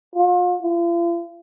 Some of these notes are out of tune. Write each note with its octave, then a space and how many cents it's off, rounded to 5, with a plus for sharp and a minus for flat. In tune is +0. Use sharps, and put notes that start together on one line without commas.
F4 +40
F4 -40